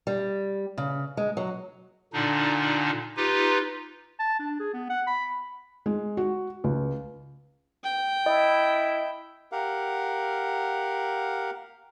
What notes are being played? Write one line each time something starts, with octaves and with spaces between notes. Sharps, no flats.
G3
C#3
G#3
F#3
A#2 D3 D4 D#4
D#4 F4 G4 B4
A5
D4
G#4
B3
F#5
B5
G#3
F#4
C#2
G5
E4 D#5
G4 A#4 F5 F#5